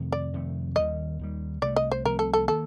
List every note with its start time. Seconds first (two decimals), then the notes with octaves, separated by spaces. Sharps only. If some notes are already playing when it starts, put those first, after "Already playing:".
Already playing: F2 C3 D#3 A3
0.12 D5
0.33 F2 C3 D#3 A3
0.76 D#2 D#3 G3 D#5
1.19 D#2 D#3 G3
1.62 C2 C3 F3 A3 D5
1.76 D#5
1.92 C5
2.05 C2 C3 F3 A3 A#4
2.19 A4
2.33 A4
2.48 D#3 A#3 A4